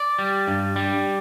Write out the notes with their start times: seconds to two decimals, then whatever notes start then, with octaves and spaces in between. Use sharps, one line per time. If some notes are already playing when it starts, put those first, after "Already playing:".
Already playing: D5
0.19 G3
0.48 G2
0.76 G3